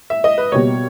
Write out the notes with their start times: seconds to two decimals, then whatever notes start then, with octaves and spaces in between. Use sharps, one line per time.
0.10 E5
0.24 D#5
0.38 B4
0.52 B2 G3 A#3 C#5